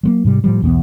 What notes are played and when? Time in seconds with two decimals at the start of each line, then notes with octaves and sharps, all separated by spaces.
0.03 F#3 G#3 A#3
0.25 G#2 C3 G3
0.44 A2 F3 G3
0.62 B1 E2 F#3 B3